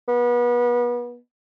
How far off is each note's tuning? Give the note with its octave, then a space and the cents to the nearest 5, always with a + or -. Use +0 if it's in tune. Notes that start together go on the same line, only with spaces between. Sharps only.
B3 -30